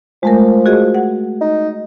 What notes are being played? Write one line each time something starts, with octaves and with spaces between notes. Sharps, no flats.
F3 G#3 A3 A#4
F#4 G#4 D#5
F#5
D#4